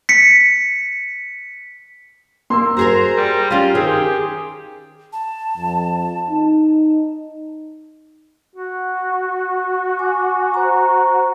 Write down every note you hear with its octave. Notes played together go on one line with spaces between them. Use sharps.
B6 C#7
A#3 C6 E6
F#4 G#4 A#4 C5 A#5
G3
C#4 F4 G4
D#3 C4 G#4
G4
A5
F2
D#4
F#4
G#5 D6
C5 A#5